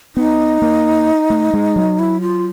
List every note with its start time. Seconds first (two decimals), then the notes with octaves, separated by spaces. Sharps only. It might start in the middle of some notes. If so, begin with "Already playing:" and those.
0.16 B3 D#4
0.62 A#3
1.30 A3
1.54 G#3
1.76 F#3
1.99 E4
2.21 F4